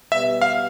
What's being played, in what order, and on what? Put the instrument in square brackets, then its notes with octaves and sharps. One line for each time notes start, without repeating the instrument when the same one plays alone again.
[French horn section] B2 G3 B3 [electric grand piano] E5
[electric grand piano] F5